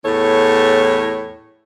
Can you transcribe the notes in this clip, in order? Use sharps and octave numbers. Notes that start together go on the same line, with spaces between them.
E2 A2 A4 C#5